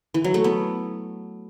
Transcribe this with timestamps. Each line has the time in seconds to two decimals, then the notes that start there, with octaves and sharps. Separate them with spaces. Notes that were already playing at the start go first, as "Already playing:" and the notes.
0.14 E3
0.24 F#3
0.34 A3
0.44 B3